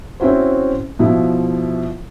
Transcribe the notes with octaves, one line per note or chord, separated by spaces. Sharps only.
C4 C#4 E4 F#4 C5
B2 F3 E4